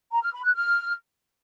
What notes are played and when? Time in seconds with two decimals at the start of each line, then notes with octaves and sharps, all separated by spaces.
0.12 A#5
0.23 F6
0.33 B5
0.44 F#6
0.55 F6